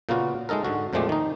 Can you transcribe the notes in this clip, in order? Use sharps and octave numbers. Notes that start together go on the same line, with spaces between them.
A#2 C#3 A#3 B3 F4 F#4
G#3 A3 D#4 A4 A#4
G#2 D3 F#4
F2 A#2 F3 G#3 A3 G4
D#3 D#4